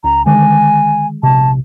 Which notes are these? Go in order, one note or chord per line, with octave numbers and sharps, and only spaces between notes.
C#2 A#5
D3 D#3 G#3 G#5
A#1 C3 A5